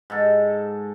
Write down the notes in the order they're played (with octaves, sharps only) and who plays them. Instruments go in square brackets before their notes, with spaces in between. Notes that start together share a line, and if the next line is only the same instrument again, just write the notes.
[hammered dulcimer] G#2 A4